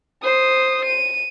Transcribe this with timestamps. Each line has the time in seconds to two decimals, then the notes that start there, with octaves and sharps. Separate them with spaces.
0.23 C5 D#6
0.85 D#7